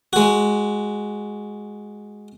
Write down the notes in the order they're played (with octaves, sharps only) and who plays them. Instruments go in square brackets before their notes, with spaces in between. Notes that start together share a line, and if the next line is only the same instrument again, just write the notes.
[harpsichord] G#3 F#4